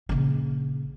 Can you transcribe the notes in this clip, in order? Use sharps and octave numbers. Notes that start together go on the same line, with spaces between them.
A#1 C#3